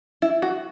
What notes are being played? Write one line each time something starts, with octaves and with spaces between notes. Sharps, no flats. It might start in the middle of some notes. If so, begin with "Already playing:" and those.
E4
F#4